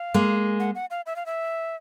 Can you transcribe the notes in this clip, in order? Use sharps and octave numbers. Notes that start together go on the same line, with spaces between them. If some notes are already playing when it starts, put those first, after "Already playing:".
Already playing: F5
G#3 A#3
F#5
F#5
F5
E5
F5
E5